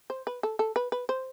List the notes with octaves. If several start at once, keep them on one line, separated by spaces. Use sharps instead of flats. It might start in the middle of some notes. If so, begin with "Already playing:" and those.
C5
B4
A4
A4
B4
B4
C5